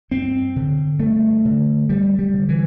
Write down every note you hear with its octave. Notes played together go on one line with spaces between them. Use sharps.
G2 C4
D3
G2 A3
D3
G2 G3
G3
D3
E3